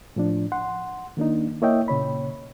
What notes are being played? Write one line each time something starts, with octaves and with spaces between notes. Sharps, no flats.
A2 F3 D4
F#5 C6
D#3 A#3 D4 D#4
A#3 E4 C#5 D#5 E5 G5
A#2 C#3 C#5 B5